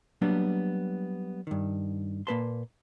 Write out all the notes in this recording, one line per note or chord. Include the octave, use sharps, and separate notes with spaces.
F#3 G3 A#3 B3 D4
G2 D#3
A#2 A#3 A#4 B4 A5 C6